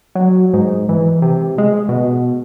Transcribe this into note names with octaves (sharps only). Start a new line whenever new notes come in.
F#3
G#2
E3
C3
G#3
B2